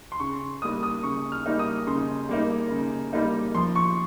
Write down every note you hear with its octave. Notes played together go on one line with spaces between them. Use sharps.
C6
C#3 C#6
G3 A#3 D#4 D#6
D#6
C#3 C#6
F6
G3 A#3 D#4
D#6
C#3 C6
G3 A#3 D#4
C#3
G3 A#3 D#4
F3 C6
C#6